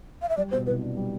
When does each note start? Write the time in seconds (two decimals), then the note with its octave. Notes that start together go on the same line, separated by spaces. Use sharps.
0.22 F5
0.29 E5
0.37 G3 D5
0.51 B2 C5
0.66 C2 B4
0.82 D4
0.97 G3